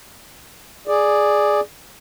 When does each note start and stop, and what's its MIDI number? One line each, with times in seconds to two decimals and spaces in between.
0.88 1.60 68
0.88 1.60 74